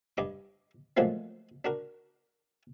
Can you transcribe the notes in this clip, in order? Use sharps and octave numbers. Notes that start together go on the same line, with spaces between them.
G2 D#5 D6
A#2 F3 F#3 G#3 A3 C4
D4 F#4 A#4